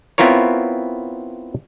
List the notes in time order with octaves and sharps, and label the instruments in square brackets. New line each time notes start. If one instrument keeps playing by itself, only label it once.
[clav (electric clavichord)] B3 C4 E4 F4 A#4 C#5